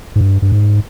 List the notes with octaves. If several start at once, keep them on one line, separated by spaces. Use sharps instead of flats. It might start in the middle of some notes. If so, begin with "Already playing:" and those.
G#2
G2
G2
G#2